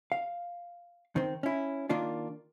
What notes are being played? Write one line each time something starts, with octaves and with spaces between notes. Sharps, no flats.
F5
D#3 C4
C#4 E4
D#3 A#3 D4 F4